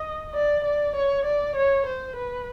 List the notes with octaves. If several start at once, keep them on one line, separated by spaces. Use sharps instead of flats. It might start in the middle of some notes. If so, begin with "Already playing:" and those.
Already playing: D#5
D5
D5
C#5
D5
C#5
C5
B4